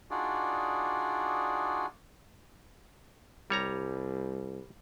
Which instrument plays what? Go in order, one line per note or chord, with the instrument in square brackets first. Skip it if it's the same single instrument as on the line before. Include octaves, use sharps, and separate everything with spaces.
[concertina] D4 D#4 F4 F#4 G#4 D5
[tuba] C2 [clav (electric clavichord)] G3 C#5 A#5